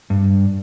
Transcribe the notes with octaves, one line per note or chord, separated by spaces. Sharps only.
G2